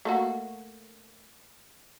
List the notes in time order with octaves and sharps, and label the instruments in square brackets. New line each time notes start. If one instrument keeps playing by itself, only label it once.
[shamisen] A3 A#3 F#4